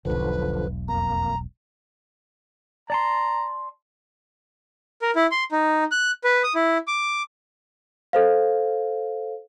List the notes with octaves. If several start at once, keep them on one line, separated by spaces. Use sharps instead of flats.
E1 B1 D3 F3 B4
F2 A#3 A#5
D5 A5 A#5 C6
A#4
E4
C6
D#4
F#6
B4
D#6
E4
D6
A4 C5 F5